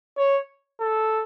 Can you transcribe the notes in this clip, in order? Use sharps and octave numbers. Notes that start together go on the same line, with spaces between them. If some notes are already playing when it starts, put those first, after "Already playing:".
C#5
A4